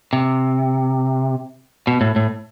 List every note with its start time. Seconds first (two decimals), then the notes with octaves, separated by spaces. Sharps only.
0.13 C3
1.87 B2
2.01 A2
2.16 A2